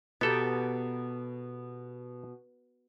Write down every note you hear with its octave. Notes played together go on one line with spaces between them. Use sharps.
B2 B3 G4 A4 A#5